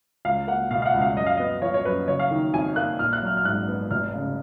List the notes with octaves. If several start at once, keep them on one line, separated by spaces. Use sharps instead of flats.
C#2 F5
A#3 F#5
B2 F5
F5
F#5
C#2
F5
F#2 D#5
F5
B3 D#5
F3 C#5
C#5
F#2 B4
F#1 C#5
F5
D#3
F2 G#5
A#3 F#6
A#1 F6
F#6
F#3 F6
F6
G#2 F#6
B3
F1 F6
C#3